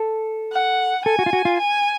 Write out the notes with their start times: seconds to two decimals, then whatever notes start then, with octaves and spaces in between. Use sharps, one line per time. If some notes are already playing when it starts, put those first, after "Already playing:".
Already playing: A4
0.52 F#5
1.05 A4 G#5
1.19 F#4
1.26 F4
1.33 F#4
1.45 F4
1.59 G#5